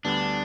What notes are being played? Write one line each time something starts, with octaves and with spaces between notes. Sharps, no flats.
D2 D3 G3 B3 D4